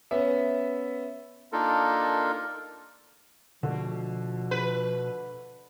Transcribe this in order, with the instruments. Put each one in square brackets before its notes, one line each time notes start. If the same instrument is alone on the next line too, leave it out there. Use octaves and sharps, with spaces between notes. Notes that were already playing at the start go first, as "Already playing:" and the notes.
[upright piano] B3 C#4 E5
[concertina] A#3 D4 D#4 F4 A4 A#4
[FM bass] B2 [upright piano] D3 A3 [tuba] F3
[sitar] B4